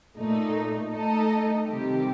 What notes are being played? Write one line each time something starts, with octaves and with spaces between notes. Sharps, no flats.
A#2 A3 D#4
A3 D#4 A4 D#5
C3 D#3 G3 C4 G4